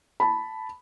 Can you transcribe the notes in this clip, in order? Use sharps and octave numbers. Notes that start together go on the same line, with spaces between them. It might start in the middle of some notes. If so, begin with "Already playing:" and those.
A5 B5